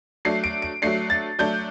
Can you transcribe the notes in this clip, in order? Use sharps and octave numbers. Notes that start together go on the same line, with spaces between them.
F#3 A3 D4 C7
D7
D7
F#3 A3 D4 C7
A6
F#3 A3 D4 G6